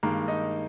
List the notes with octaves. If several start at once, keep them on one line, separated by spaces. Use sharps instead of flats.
G2 D#3 G#3 A#3 A#4
D#4 D#5